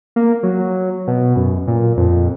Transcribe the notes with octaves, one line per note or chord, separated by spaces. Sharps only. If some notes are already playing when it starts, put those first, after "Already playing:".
A#3
F#3
B2
F#2
A#2
F2